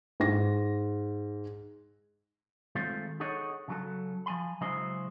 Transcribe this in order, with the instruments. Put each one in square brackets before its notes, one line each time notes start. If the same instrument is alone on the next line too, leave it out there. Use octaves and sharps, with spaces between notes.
[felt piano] G#2 A#6
[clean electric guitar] D#3 G#3 A3 C4 F4
D#4 G#4 A4 C#5 D#5 F#5
C#3 F#3 A4
F3 G#5 B5
C#3 F#3 G#3 E4 C5 D#5